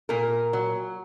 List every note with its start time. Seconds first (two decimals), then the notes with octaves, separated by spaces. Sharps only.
0.09 A#2 A#4
0.53 F#3